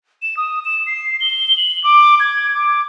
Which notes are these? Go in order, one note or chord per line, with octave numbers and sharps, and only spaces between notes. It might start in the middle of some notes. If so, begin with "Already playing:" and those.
E7
D#6
E7
C7
G7
F#7
D6
G#6
D6